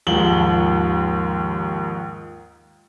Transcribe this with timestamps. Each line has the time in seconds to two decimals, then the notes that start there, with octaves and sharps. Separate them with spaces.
0.07 D#2 G#2 F3 F#7 G7